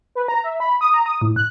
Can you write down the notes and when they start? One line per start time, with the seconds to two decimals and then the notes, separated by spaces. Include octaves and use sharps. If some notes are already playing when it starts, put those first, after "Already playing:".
0.15 B4
0.28 A#5
0.44 E5
0.60 B5
0.81 D#6
0.94 A#5
1.06 D#6
1.21 A2
1.36 F#6